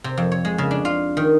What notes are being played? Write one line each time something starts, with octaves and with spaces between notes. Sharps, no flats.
C3
F2
C#5
G#3
C#3
D4
F4
D#3